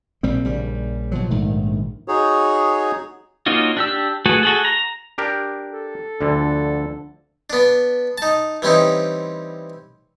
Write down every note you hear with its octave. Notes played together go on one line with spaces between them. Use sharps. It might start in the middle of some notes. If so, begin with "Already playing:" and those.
A#1 G3 C4
A#1 C#3 G3
B2 F3 F#3
A#1 G#2 D#3 A3
D#4 F#4 G#4 C#5
A#3 C#4 D#4 F4 F#4
D4 G4 E6
A3 F#4 G#4 B4
F#4 G#4 A4
A#5
D4 G4 A#4
A4
D2 D3 F3 D4
B3 D4
D#4 A5
E3 G3 C4 C#4 D#4